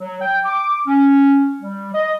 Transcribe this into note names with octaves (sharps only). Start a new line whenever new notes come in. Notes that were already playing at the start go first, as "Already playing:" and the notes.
F#3
G5
D6
C#4
G3
D#5